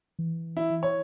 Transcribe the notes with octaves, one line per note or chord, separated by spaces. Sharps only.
E3
E4
C#5